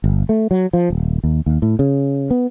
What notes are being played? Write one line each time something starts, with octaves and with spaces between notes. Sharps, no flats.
G1
A3
F#3
F3
D#1
D#2
D#2
A2
C#3
B3